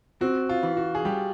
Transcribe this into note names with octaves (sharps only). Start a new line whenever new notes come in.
C4 F#4
F4
E3
F#4
G#4
G3 G4